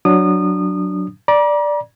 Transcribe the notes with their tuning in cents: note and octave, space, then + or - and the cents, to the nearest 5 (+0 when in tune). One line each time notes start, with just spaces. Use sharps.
F#3 +0 D4 +0 D#6 -25
D5 +0 A#5 +40